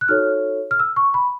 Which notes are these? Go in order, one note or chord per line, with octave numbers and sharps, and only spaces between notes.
F#6
D#4 F#4 A4 C#5 F6
F6
E6
C#6
B5